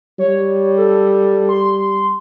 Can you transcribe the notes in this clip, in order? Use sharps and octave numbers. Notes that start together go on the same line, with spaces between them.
G3 C#5
A4
C6